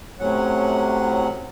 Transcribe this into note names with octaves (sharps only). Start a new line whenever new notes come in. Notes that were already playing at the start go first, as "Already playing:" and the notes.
A2 C3 F#3 C#4 F#5